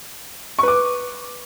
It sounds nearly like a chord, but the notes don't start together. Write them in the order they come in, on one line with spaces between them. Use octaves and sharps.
C#6 B4 D6